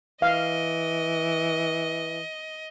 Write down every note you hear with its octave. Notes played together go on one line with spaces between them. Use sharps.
E3 D#5 F5